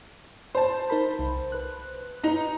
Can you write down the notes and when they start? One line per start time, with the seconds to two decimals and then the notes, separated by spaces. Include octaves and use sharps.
0.55 C5 A5
0.90 D#4 A#4 B5
1.19 C2
1.52 B4 F#6
2.24 D#4 A#5